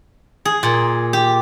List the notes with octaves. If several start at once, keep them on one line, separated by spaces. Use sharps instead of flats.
G#4
A#2
G4